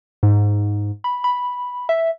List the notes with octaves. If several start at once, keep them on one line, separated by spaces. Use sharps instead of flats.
G#2
B5
B5
E5